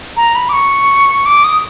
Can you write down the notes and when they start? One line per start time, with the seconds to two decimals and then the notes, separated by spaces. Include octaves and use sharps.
0.17 A#5
0.35 B5
0.49 D6
0.53 C#6
1.26 D6
1.44 D#6